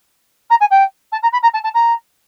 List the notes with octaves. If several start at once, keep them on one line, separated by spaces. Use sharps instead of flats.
A#5
G#5
G5
A5
A#5
B5
A#5
A5
A5
A#5